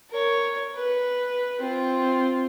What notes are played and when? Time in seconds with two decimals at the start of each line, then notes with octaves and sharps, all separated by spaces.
0.11 A#4 C#5
0.75 B4
1.61 C4 F4